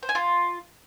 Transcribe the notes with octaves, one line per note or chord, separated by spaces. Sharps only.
C5
G#5
F4